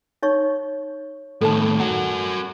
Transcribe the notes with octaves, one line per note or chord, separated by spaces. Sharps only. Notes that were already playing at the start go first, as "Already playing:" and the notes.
D#4 C#5 C#6
A2 D#3 A4 B4 A5
F#4 A#4 F#5